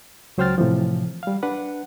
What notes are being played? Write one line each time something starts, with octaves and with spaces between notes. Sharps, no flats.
C#2 F#3 C5 G5 F6 A6
A2 C3 E3 F3
G3 F5
D4 B4 F#5